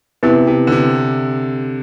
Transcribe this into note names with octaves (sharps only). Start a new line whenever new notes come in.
C3 B3 E4 B4
C3
D3
C3